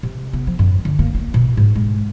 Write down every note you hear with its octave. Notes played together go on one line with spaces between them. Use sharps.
C3
B3
F3
F#2
D3
A#3
A#3
B2
G#2
G#3